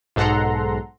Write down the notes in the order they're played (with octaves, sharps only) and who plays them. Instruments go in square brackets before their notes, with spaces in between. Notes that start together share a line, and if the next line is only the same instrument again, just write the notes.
[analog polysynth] B1 G#2 A4 F#5 A#5 C6